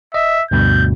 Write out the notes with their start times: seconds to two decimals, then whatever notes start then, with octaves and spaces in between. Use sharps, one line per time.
0.14 D#5 E5
0.51 D2 G2 B2 G6